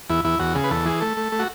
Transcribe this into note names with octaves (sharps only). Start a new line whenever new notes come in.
E2 E4
E2 E4
E2 F#4
C#3 G#4
B4
E2 A4
E3 G#4
A3 A4
A3
A3
F#4